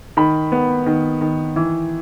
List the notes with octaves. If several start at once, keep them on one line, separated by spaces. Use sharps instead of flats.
D#3 B5
B3
D#3
D#3
E3